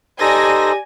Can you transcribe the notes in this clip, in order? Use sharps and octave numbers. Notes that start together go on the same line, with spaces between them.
D#4 G4 A4 C5 D5 G#5 A#6